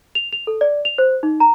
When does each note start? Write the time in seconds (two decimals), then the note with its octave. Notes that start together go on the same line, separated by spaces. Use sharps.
0.15 F7
0.33 F7
0.47 A4
0.61 D5
0.85 F7
0.98 C5
1.23 D#4
1.40 A#5